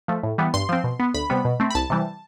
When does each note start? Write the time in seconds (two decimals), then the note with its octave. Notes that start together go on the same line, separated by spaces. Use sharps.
0.08 F3 A3
0.23 A2
0.38 E3 G3 B3
0.54 G2 C6
0.69 F3 C4
0.84 B2
0.99 B3
1.14 D2 B5
1.30 C3 G3 B3
1.45 B2
1.60 A3 C4
1.70 B5
1.75 C2 A5
1.90 C3 E3 G3